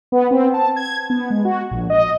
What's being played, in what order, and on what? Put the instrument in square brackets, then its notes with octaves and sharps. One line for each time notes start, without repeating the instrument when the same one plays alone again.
[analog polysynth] B3
C4
A5
G#6
B3
G#3
F#4
A#1
D#5